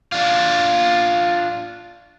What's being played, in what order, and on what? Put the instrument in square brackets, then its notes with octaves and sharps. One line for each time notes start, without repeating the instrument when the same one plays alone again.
[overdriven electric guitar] D4 F4